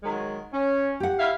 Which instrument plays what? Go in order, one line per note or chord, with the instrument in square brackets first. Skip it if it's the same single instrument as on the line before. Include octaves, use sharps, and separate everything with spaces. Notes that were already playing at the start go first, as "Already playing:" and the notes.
[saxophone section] D#3 F#3 G#3
C#4
[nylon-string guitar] G4 F#5
[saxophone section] E4 F5